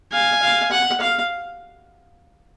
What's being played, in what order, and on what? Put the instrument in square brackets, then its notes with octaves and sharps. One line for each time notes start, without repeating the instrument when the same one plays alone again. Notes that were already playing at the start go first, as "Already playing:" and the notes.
[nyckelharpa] F5 [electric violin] G#5
[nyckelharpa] F5
F#5
F5